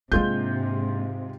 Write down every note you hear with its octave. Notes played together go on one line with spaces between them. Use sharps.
G#2 C3 G#3 A#3 D4 F4 G6